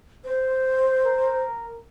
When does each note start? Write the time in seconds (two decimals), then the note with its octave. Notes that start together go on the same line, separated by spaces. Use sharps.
0.25 C5
1.05 A#4